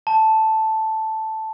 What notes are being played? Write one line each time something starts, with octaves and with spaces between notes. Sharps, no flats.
A5